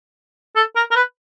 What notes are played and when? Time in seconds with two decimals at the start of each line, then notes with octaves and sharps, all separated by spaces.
0.56 A4
0.76 A#4
0.91 A#4
0.95 B4